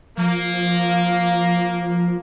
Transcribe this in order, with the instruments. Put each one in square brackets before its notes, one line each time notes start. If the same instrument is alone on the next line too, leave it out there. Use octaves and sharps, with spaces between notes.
[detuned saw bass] F3 [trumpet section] A#3